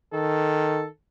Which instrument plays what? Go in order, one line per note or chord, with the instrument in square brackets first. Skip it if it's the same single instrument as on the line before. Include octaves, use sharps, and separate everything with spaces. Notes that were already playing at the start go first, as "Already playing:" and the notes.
[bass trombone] D#3 [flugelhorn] A4